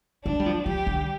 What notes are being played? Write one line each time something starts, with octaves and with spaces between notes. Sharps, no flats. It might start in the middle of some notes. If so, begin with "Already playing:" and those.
G#3 D4
G3
F3
F3 G3 G4
D3